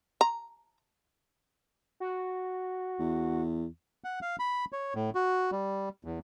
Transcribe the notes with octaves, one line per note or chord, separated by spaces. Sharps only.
A#5
F#4
E2
F#5
F5
B5
C#5
A2
F#4
G3
E2